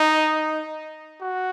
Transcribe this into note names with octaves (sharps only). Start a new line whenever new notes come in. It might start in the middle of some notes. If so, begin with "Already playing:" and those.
Already playing: D#4
F#4